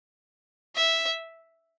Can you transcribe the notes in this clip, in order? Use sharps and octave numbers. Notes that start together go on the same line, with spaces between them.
E5